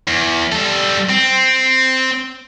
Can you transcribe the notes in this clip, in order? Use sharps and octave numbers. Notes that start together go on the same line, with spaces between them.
E2
G3 A4
C4